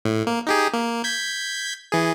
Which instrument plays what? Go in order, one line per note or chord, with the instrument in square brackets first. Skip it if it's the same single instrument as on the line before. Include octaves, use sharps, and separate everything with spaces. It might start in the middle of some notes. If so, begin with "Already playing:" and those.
[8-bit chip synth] A2
A#3
D#4 G4 G#4
A#3
G6 G#6 B6
E3 G#4